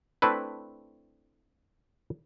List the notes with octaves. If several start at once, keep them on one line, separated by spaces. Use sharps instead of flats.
A3 C4 D4 E4 B4